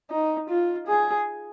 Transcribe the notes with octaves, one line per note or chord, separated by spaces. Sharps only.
D#4
F4
G#4